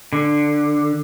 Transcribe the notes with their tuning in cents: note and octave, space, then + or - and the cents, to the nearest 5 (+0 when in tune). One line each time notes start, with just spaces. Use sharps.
D3 +10